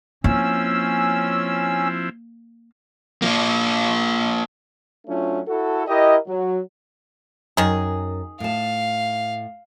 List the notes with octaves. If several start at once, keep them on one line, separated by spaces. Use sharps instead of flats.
F3 A#3 C4 C#4 E4 E6
F3 A#3
F#3 A3 C#4 D4 F4
E4 F#4 A4
E4 G4 A#4 D#5
F#3
F#2 D#3 D#4 G#4
A2 F5 A5